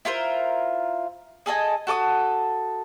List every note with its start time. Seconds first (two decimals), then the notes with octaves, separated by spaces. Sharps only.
0.05 E4 F4 A#4 C5
1.46 G#4 A4 D#5 G#5
1.87 F#4 A4 D6 D#6